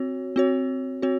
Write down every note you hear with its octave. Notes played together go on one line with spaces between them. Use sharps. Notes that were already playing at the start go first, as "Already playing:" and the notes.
Already playing: C4 F#4 C#5
C4 F#4 C#5
C4 F#4 C#5